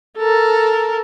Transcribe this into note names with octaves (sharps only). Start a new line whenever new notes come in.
A4 A#4